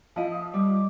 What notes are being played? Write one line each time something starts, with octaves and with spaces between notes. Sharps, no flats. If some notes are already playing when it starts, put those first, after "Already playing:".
F3 E4 D#5 F5
D#6
G3 D6